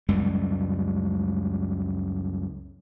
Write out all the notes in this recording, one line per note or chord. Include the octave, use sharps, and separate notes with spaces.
C#2 F#2 G3 G#3